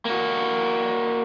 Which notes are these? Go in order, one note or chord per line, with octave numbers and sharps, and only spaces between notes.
A#3 F#4